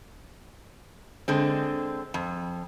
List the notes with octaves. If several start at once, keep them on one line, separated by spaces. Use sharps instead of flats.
D3 G#3 C4
F2